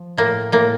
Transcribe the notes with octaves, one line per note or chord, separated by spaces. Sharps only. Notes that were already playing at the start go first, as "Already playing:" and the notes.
Already playing: F3
A2 A#3
A2 A#3